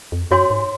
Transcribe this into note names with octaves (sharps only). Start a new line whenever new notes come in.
F2
F#2 F#4 C#5 G#5 C6
G#2